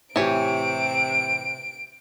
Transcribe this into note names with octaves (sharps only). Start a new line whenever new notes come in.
A2 C3 E3 G4 C#5 D7